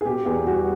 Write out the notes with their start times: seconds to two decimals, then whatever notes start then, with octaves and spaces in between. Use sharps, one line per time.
0.01 G#4
0.05 B2 G4
0.25 E2 G#4
0.47 G3 F#4